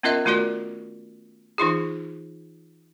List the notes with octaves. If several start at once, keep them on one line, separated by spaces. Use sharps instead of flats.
B3 C#4 F4 A#4 D#5 E5
D#3 A3 F4 F#4 A#4 D5
E3 D#4 F4 G#4